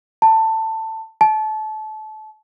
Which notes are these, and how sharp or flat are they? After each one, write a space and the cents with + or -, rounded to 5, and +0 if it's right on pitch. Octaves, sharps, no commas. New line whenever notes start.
A5 +15
A5 -25